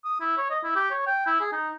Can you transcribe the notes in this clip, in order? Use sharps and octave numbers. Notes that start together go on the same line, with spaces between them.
D#6
E4
C#5
D#5
E4
G4
C#5
G5
E4
G#4
D#4